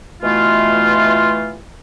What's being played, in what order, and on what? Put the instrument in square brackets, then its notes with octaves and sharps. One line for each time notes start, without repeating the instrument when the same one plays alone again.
[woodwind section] B2 E3 A3 F4